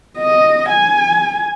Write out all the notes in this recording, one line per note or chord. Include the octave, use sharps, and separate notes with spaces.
D#5
G#5